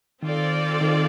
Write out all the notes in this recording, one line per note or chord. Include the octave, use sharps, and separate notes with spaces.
D#3 C4 F4 A4 D5
D#3